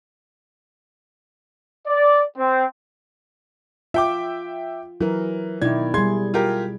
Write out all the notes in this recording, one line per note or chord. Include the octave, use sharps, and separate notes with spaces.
D5
C4
F4 E5 G5 D6
E3 F#3 A#4
B2 D#3 E4 D5 G#6
G3 G#4 C6 G#6
F4 G4 A#4